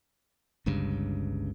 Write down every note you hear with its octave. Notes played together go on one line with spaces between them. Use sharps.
G1 C#2 G2 C#3